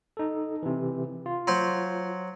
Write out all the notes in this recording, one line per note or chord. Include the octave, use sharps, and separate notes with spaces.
D#4 A4
C3 E3
F4
F#3 C5 C6